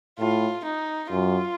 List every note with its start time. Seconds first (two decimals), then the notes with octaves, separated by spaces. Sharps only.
0.19 A2 F4
0.65 D#4
1.10 F#2 F4